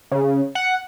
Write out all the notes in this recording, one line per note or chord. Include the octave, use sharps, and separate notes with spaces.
C#3
F#5